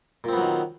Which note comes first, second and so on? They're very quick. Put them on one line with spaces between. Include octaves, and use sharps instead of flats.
A#2 C4 B3 F#3 D#3